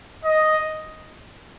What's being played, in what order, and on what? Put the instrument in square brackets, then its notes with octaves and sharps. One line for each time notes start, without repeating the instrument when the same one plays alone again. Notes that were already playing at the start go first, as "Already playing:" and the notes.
[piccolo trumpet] D#5